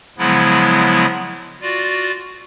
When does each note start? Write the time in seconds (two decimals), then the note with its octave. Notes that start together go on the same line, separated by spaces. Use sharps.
0.18 C#3 F3 F#3 G#3 B3 E4
1.62 F4 F#4 D5